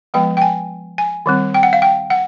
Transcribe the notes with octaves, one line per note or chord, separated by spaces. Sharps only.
F3 G#3 B3 G5
G5
G#5
G#5
D#3 G3 C4
G5
F#5
F5
G5
F#5